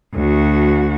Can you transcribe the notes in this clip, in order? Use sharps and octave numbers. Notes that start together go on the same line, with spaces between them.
D2 F#4